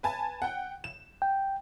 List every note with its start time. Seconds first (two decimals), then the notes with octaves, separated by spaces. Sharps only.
0.03 B4 G#5 A5
0.42 F#5 G5
0.84 E7
1.22 G5